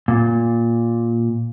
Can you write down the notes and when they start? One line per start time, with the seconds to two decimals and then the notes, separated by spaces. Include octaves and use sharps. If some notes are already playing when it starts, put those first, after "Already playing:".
0.08 A#2